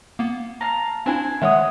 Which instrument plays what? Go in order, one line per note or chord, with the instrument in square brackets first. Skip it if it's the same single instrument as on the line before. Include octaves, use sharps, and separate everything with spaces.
[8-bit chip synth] A#3 B3
[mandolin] F5 A5 A#5
[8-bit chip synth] C4 D4 E4 [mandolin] C5 G#5
[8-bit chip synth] D#3 G#3 C#5 [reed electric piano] E5 F#5 D#6